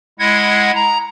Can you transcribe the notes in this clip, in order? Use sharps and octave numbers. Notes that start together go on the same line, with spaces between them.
G#3 E4 D#5 F#5 G#6
A#5